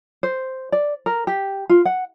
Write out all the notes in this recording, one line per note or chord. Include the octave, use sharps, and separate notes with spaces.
C5
D5
A#4
G4
F4
F#5